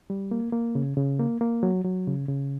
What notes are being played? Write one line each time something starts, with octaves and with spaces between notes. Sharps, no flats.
G3
A#3
A#3
C#3
C#3
A#3
A#3
F#3
F#3
C#3
C#3